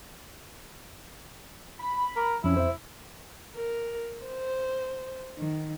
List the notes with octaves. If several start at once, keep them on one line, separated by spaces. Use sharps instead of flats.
B5
A#4
F2 F3 C#4 E4
C5 E5
A#4
C5
D#3